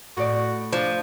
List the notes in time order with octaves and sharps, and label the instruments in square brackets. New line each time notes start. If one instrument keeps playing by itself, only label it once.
[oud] A2 D5 [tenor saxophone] F#4
[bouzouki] F3 [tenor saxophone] D4